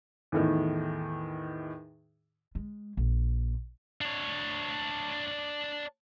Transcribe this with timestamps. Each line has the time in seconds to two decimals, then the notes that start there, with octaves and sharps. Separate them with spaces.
0.32 E2 A2 D#3
2.55 G#3
2.97 A#1
4.01 D4 C#5